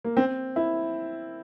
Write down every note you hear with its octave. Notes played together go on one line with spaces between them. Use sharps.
A#3
C4
E4